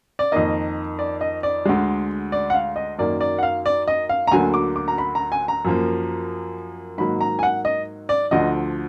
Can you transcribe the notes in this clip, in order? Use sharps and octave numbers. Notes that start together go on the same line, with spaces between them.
D5
F2 D#3 A#3 D#5
D5
D#5
D5
D2 D3 G#3
D5
F#5
F5
D#5
F#2 D#3 A#3 D5
D5
F#5
F5
D5
D#5
F5
A#5
D2 D3 F#3 A#3 G#5
D6
D6
A#5
B5
A#5
G#5
A#5
F#2 F3 A#3
G#2 D#3 F#3 A#3 B5
A#5
G#5
F#5
D#5
D5
D2 D3 F3 D#5